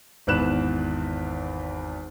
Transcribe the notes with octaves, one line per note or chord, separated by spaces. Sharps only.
G#1 E2 B4 F#6 E7